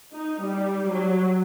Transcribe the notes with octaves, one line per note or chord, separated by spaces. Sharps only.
D#4
G3
F#3